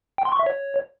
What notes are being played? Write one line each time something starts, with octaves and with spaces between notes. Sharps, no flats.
G5
C6
C#6
E5
C#5